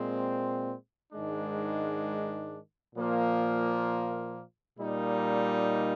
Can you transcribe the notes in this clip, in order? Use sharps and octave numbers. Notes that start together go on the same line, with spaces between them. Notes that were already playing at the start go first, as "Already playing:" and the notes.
Already playing: A#2 G#3 C4
G#2 D#3 G#3 D4
A#2 F3 A#3 F4
A#2 G3 A#3 D#4